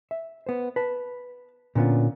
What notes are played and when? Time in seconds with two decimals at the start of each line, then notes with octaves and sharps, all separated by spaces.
0.11 E5
0.46 B3 C5
0.76 B4 A5
1.75 A#2 D3 B3 C#4 F4